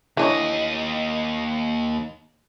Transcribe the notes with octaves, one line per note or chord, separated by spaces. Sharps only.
D#2 E3 D4 C#5 D#5